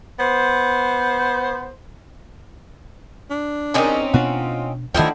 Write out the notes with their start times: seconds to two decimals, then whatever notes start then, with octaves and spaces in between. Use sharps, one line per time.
0.19 B3 C5
3.30 D4
3.74 D#3 C4 C#4 D#4 G4 G#4
4.14 B2 B3 D4 F4 F#4
4.94 D2 D3 D#3 F3 A3 D#4 E4 G5